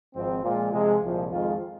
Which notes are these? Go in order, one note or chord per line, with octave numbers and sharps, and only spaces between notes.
G#1 G#2 F3 C4
A#2 F3 G#3 F4
C3 F3 G#3
C2 A#2 F3
F2 D#3 G#3 F4